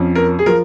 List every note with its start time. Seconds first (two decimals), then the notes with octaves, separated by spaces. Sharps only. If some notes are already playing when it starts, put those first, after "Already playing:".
Already playing: F2 F3 C#4
0.15 A#4
0.39 G#4
0.46 F3 A#4